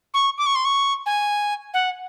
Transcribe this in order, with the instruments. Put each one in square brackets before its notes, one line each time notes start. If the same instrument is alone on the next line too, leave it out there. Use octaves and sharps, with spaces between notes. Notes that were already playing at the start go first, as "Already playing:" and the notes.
[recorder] C#6
D6
C#6
C6
C#6
G#5
F#5